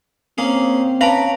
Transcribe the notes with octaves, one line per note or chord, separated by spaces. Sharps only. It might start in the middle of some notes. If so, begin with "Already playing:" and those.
A#3 C4 C#4 G#4
C#4 B4 F5 A5 A#5